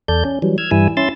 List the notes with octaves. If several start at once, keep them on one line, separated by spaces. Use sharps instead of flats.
E2 A4 D5 G6
C#4
E3 F#3 G3
E6 F6 G#6
G2 E3 G3 E4 G#5 E6
C#4 E4 C6 E6 A6